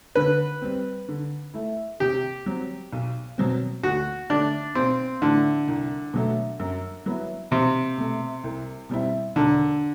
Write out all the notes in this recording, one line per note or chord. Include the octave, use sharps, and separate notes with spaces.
D3 B4
G3 C4
D3
A3 E4
C3 G4
F#3 C4
B1
B2 F#3 C4
D2 F#4
D3 A3 D4
B1 C4
A2 D3 E3 A3
C2
B2 F#3 A3
F#2
F#3 B3 E4
B1 C3
B2 A3
C2
B2 G3 C4 E4
E1 D3